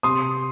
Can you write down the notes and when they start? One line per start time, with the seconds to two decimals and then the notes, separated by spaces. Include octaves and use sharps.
0.03 C3 C6 D#6